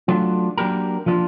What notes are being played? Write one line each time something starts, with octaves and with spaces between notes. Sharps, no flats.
F#3 A3 D4 F4
F#3 A#3 D4 G4 A#4
F3 A#3 D4 F4